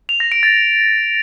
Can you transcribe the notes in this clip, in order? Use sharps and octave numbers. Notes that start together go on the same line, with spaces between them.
F7
A#6
D7
A6